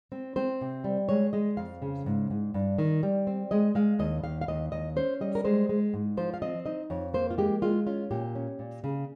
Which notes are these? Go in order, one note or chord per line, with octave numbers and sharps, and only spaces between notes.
C4
C4 C5
C3
G3
G#3 C#5
G#3 D#5
F2 F5
C#3
G#2
G#2
G2
D#3
G3
C4
G#3 D#5
G#3 F5
D#2 D#5
D#2 F5
F5
D#2 D#5
D#2 D#5
C#4 C5
G3 D#5
A#4
G#3 C5
G#3
G#2
F3 C5
F5
C4 D#5
D#4 D#5
F2 C#5
A#3 C5
F4
G#3 G4
G#3 F4
C#4 F4
A#2 G4
C#4
A#2
C#3